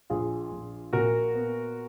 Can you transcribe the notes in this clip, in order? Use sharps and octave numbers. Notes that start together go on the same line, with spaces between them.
A#1 F4 G#4
A#1
A#2 F#4 A#4
B3